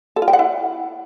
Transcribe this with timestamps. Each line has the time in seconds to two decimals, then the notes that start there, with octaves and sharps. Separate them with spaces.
0.16 A4
0.22 F4
0.28 G5
0.33 F#5
0.39 E4